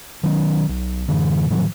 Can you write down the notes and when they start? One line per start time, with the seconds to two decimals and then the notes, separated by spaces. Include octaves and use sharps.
0.23 D#3 F#3 C4 C#4
0.69 B1
1.08 F#2 D3 E3
1.50 A2 D#3 F3 F#3